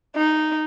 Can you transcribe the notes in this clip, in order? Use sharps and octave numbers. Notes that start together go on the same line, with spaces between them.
D#4